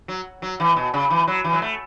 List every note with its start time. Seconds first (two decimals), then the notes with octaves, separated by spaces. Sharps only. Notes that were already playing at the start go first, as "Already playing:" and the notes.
0.08 F#3
0.42 F#3
0.60 E3
0.76 B2
0.94 C#3
1.10 E3
1.27 F#3
1.44 E3
1.53 F#3
1.62 A3